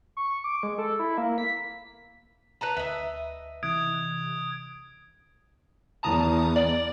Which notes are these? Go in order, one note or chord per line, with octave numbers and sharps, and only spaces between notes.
C#6
D6
G#3
A4
E4
A#3
B6
B4 A5 A#5
D2 B4 D#5 E5
C3 E3 D#6 F#6 G#6 D7
E2 A5 A#5 D#6
D5